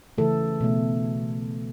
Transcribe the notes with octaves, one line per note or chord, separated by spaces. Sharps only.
C#3 E3 A3 A4
B2 A3